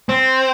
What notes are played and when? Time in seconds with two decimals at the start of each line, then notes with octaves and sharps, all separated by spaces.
0.09 C4